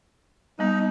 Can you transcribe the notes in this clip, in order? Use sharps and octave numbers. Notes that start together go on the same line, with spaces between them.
G3 B3 D#4